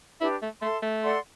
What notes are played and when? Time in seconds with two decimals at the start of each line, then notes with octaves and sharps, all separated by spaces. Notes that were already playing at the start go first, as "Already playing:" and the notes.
0.21 D4 E4 G4 B4 D5
0.42 A3
0.62 A3 A4 E5 A5 C6
0.82 A3
1.03 A4 D5 F#5 C6